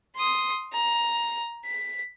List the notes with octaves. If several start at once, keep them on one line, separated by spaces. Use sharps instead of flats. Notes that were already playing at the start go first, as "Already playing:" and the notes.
C6 D#6
A#5
B6